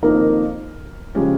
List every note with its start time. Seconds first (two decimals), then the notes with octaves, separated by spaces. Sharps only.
0.03 F2 D#3 A#3 D#4 A#4
1.15 C#3 F3 G#3 C#4 G4